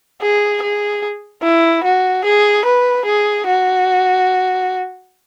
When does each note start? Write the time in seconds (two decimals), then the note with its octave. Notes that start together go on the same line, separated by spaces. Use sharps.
0.22 G#4
0.63 G#4
1.43 E4
1.84 F#4
2.25 G#4
2.65 B4
3.06 G#4
3.47 F#4